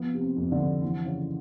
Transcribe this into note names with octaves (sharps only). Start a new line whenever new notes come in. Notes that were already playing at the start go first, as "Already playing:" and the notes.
Already playing: F3 B3
C3
C4
F2
D3 D4
F2
E3 C4
C#3 C#4